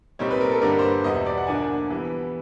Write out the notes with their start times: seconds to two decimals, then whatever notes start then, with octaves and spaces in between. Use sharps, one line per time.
0.19 A#2 G3 C4 D#4 C#5
0.31 B4
0.41 A#4
0.51 A4
0.62 G2 D3 G3 A#3 D4 A#4
0.79 C5
0.83 B4
1.04 E2 B2 G3 B3 D#5
1.15 E5
1.26 D5
1.37 F#5
1.47 D3 F3 A#3 D4 G#5
1.90 E3 G3 B3